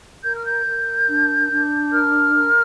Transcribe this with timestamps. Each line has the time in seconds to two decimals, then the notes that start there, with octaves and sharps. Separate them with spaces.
0.23 A#4 G6
0.35 F6
0.44 G6
0.66 A#4
1.07 D4
1.50 D4
1.92 A#4 F6
2.34 A#4